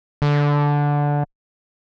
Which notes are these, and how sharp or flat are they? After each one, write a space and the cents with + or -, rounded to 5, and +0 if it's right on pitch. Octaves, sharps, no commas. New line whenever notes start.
D3 -10